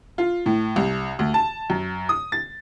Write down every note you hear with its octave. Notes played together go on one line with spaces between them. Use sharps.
F4
A2
C2
D2
A5
F#2
D#6
A6